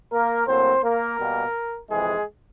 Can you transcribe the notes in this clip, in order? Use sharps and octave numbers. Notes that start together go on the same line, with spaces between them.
A#3 A#4
A2 F#3 A#3 C4 C5
A#3 A#4
B2 G3 A#3
F2 C3 E3 G#3 G#4